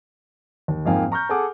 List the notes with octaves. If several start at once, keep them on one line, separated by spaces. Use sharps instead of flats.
D#2
F2 G#2 A#3 F5 G5 G#5
A#5 C#6 F6 G6
G#4 A4 F#5 G#5 D6